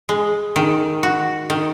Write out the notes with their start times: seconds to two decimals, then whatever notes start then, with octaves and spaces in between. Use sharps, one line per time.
0.09 G#3
0.56 D#3
1.03 F#4
1.50 D#3